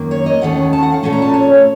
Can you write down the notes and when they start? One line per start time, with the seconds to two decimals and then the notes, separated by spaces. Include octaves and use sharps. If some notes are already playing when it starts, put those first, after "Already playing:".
Already playing: F#2 D#3 A#3
0.11 C#5
0.26 D#5
0.41 D#2 D#3 A3 C#4 F#5
0.73 A5
0.83 F#5
0.92 F5
1.03 A#2 A3 C#4 A5
1.13 A#5
1.22 A5
1.34 C#5